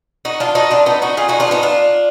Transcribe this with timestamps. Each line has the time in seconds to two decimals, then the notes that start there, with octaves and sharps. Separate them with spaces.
0.25 D#4 F#4
0.40 D4 F4
0.55 D#4 F#4
0.71 D4 F4
0.86 B3 D#4
1.02 D#4 F#4
1.17 F4 G#4
1.29 D#4 F#4
1.40 D4 F4
1.51 B3 D#4
1.63 D4 F4